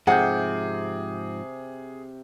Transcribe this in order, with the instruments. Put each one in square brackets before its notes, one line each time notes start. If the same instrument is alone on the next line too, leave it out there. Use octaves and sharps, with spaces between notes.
[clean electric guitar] G#2 F3 C4 [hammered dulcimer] C3 G5 [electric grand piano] G#4 [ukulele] F#5